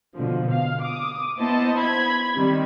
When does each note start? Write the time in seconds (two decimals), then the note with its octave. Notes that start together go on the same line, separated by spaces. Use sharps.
0.17 B2 D3 F3
0.51 F5
0.81 D6 D#6
1.39 B3 E4 C5 D#5 A5
1.79 B5 G#6
2.35 D#3 G3 C4